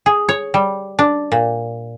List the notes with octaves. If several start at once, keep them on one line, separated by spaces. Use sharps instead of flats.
G#4
C#5
G3
D4
A#2